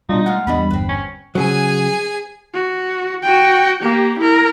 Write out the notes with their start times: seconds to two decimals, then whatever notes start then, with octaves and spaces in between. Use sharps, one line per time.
0.09 B2 G3 D4 D#4 F4
0.26 G#3 A3 F4 F#5
0.47 E2 G3 B3 D4 G#4 D#5 B5
0.71 G1 C4 B4
0.89 C#4
1.35 C#3 F#3 G#4 G#5
2.54 F#4
3.23 F#4 G5
3.82 A#3 G4
4.19 E4 A#4